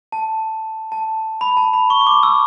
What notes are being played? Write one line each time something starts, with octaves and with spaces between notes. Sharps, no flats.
A5
A5
B5
A5
B5
C#6
C#6
D6
E6